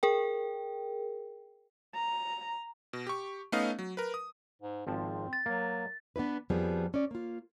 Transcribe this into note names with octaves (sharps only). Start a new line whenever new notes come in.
G#4 A#4 G5
A#5
B2
G4 C#6
A3 B3 C#4 D#4 D#5 F5
F#3
A#4 B4
D#6
G#2
G#1 F3 C4 A5
A6
F#3 A#3
B3 D4 E4 B4
F2 F3 G3 B3 G#4
C#4 D5
A#3 F4